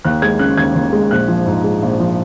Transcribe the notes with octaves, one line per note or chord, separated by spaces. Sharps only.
D#2 F#6
G#3 G#6
C#3 F#6
D#2 G#6
D#2
G#3
A#1 F#6
F3
G#2
G#3
A#1
F3